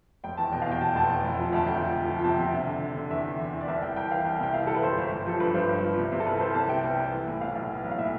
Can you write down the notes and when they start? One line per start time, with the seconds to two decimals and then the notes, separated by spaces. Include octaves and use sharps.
0.24 F1 G5
0.37 E2 A5
0.52 B2 G5
0.62 F5
0.66 E2
0.71 G5
0.81 B2 A5
0.88 G5
0.95 F1 A5
1.09 E2
1.24 F1
1.39 F3
1.53 D2 A5
1.67 D2 G5
1.81 F3
1.96 F3
2.10 F3
2.19 G5
2.24 C3 A5
2.39 C3
2.53 D3
2.67 D3
2.82 D3
2.96 D3
3.10 E2 E5
3.25 E2
3.40 E2
3.53 E2
3.60 D5
3.68 C2 E5
3.82 C2 G5
3.96 C2 G5
4.11 E3 F5
4.25 C2
4.40 C3 G5
4.54 C2 F5
4.67 E3 A4
4.75 B4
4.83 G1 C5
4.98 G1
5.12 G1
5.26 F3 A4
5.40 G2 B4
5.54 G2 C5
5.69 G2
5.83 F3
5.97 C3
6.12 C3
6.20 A4
6.26 C2 B4
6.40 C2 C5
6.55 C3 A5
6.69 C3 G5
6.84 C2
6.98 C2
7.12 E3
7.27 A2
7.41 B1 F5
7.55 B1
7.70 E3
7.84 B1
7.91 F5
7.98 A2 E5